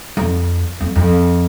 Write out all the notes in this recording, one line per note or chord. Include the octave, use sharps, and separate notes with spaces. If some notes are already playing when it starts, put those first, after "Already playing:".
F2
F2
F2